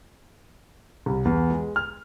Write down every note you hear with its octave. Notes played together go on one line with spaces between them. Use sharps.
C2
E2
G#3
F6